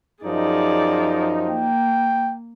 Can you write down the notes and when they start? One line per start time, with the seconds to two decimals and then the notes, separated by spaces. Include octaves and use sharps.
0.24 F#2 F3 D#4 G#4 D5
1.49 A#3 G5